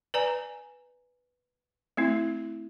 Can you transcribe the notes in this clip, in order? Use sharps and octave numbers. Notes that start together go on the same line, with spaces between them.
B4 D5 G#5 A#5
A3 C4 E4